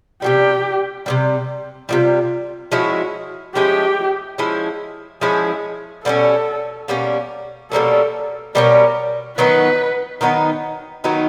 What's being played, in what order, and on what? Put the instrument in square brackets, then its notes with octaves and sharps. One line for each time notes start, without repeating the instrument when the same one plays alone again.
[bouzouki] C3 D#3 G3 [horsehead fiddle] G4
[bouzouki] C3 D#3 G3
[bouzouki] C3 D#3 G3 [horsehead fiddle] F4
[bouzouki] F3 G#3 C#4 E4 [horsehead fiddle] F#4
[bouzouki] F3 G#3 C#4 E4 [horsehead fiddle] G4
[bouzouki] F3 G#3 C#4 E4
[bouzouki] F3 G#3 C#4 E4 [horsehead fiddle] G#4
[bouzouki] B2 G3 A#3 C#4 [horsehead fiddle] A4
[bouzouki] B2 G3 A#3 C#4
[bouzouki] B2 G3 A#3 C#4 [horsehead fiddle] A4
[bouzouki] B2 G3 A#3 C#4 [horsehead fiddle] A#4
[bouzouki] D#3 F#3 B3 D#4 [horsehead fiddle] B4
[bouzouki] D#3 F#3 B3 D#4
D#3 F#3 B3 D#4